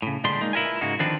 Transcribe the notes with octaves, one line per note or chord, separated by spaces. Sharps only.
A2 C#3
A#2 D3 G3 G#3 D4 C6
G#3 A#3 D#4
E4 F4 A#4 B4 G#5
G#2 C#3 G#3 A#3 F#4
D3 D#3 F3 C4 D4 B4